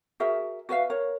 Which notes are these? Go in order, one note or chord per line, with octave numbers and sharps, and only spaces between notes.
F#4 G#4 A#4 E5
F#4 B4 E5 F5
A#4 C#5